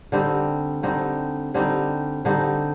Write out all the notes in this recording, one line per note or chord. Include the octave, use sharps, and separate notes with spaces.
D3 G3 C4 D#4
D3 G3 C4 D#4
D3 G3 C4 D#4
D3 G3 C4 D#4